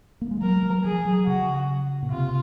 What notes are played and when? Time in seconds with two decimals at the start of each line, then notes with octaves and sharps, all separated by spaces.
0.21 A#3
0.31 G#3
0.42 F#3 A#4
0.63 F#3
0.84 F3 G#4
1.05 F#3
1.26 C#3 F#4
2.03 A#2
2.12 C3 F4